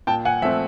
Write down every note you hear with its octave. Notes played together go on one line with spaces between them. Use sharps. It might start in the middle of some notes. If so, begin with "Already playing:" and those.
A#2 G5 A5
F#5 G#5
F3 A3 C4 E5